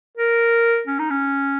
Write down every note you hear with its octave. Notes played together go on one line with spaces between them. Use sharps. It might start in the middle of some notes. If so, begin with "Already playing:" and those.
A#4
C#4
D#4
C#4